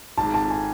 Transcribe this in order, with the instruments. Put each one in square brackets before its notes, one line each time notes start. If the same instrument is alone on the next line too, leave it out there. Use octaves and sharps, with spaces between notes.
[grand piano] G#1 G#2 G#3 [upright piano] A5
[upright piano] A5
G#5